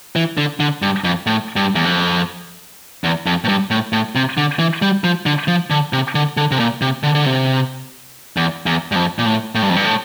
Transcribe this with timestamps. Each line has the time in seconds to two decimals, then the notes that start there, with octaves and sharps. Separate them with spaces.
0.16 E3
0.37 D3
0.60 D3
0.82 G2
1.04 F2
1.26 A2
1.56 G2
1.75 E2
1.85 F2
3.04 E2
3.26 F2
3.44 A2
3.48 G2
3.71 A2
3.93 A2
4.15 C3
4.37 D3
4.59 E3
4.82 G3
5.04 F3
5.26 D3
5.48 F3
5.70 D3
5.93 C3
6.15 D3
6.37 D3
6.51 C3
6.60 A#2
6.81 C3
7.03 D3
7.15 D3
7.26 C3
8.37 E2
8.66 E2
8.92 G2
8.96 F2
9.19 A#2
9.26 A2
9.55 A2
9.62 G2
9.70 F2
9.76 G2
9.85 A2